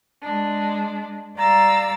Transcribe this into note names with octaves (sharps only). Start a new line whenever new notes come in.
G#3 D4
G3 D5 F5 A#5 E6 A6